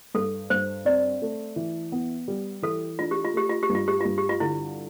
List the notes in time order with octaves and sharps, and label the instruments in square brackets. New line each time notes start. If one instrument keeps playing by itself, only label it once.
[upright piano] G2 [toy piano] A4
[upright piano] G2 [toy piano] C5
[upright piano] C4 [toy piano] D5
[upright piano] A3
E3
B3
G3
[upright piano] E3 [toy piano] A4
[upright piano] D4 [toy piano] F4
[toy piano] G4
F4
[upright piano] A3 [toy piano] G4
[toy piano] F4
G4
[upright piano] G2
[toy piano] F4
G4
[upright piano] G2 [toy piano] F4
[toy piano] G4
F4
[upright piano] D3 [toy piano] E4